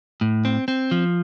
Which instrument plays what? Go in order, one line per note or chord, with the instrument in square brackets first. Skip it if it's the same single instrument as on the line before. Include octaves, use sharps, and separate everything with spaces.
[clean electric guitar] A2
C4
C4
F3